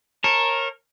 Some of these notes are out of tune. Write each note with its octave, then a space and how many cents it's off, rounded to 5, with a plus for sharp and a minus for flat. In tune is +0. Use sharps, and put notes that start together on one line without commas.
A#4 +0 C#5 -25 A5 +0